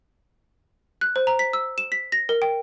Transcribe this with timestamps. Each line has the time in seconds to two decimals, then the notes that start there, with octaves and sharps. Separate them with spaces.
1.01 F#6
1.16 C5
1.27 A#5
1.39 B6
1.53 E6
1.78 E7
1.92 B6
2.12 A#6
2.29 A#4
2.42 G5